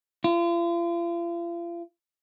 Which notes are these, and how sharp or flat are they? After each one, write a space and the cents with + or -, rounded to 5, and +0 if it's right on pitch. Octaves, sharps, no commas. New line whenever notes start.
F4 -40